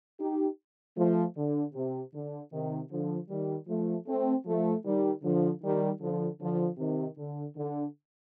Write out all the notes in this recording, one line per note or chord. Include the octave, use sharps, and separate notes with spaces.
D#4 G4
F3 A3
D3
C3
D3
C3 D#3
D3 F3
D#3 G3
F3 A3
A3 C4
F3 A3
D#3 G3
D3 F3
D#3 G3
D3 F3
D3 F3
C3 D#3
D3
D3